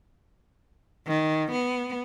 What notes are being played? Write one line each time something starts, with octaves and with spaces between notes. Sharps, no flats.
D#3
B3